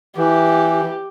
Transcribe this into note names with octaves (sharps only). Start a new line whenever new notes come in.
E3 G4